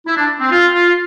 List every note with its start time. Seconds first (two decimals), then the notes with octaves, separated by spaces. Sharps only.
0.06 E4
0.17 D4
0.40 C4
0.51 F4
0.74 F4